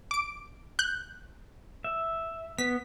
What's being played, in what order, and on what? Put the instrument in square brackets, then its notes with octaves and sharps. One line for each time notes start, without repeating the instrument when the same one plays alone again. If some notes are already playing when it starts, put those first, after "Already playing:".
[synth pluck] D6 D7
F#6 G6
[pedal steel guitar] E5
[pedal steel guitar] B3 [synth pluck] B6